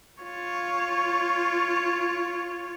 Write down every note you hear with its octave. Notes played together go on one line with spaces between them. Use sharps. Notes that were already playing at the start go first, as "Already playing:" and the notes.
F4 C#5